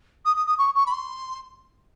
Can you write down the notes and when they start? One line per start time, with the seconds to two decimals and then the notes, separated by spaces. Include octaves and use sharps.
0.25 D#6
0.36 D#6
0.46 D#6
0.58 C#6
0.74 C#6
0.86 B5
0.91 C6